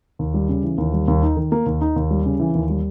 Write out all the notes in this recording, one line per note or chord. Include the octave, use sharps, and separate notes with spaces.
D#2
G3
C#3
E3
D#2
G3
D#2
D#4
D#3
A#3
D#2
D#4
D#2
G3
C#3
E3
D#2
G3